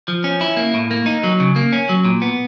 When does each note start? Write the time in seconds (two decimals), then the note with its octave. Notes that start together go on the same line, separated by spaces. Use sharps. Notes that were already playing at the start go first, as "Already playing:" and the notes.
0.08 F3
0.24 C#4
0.41 E4
0.57 A#3
0.74 A2
0.91 A#3
1.06 D#4
1.23 F#3
1.40 C#3
1.56 A#3
1.72 C#4
1.89 F#3
2.05 A#2
2.22 B3